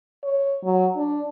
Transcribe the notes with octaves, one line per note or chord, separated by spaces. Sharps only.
C#5
F#3
D4